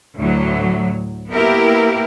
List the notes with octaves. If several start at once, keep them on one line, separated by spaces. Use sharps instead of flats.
D2 A2 F#3
A#3 B3 E4 G4 A#4